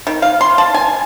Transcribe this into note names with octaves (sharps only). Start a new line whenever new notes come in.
D#3
F5
C6
A5
G#5